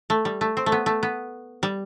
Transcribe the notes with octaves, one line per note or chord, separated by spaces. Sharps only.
A3
G3
A3
C4
A3
B3
A3
B3
G3